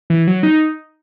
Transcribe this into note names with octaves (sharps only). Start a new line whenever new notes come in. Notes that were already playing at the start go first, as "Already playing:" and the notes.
E3
F#3
D#4